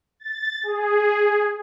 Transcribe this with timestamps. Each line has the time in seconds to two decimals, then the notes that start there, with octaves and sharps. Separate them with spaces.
0.20 A6
0.63 G#4